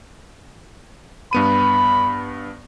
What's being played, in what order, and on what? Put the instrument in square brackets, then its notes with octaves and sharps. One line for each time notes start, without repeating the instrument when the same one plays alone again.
[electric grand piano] G2 B3 D#7 [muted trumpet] B5